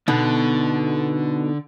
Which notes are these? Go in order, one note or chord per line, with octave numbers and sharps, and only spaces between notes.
B2 D3 B3 D#4 A4